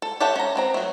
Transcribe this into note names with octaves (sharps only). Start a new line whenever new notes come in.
A4
G4 A4 C#5 E5 F#5
C#4 A#5
B3 C4 A#5
F#3 A3